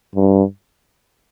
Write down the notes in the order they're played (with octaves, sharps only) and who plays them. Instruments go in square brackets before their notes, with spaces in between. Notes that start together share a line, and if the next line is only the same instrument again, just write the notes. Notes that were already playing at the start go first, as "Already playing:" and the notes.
[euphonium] G2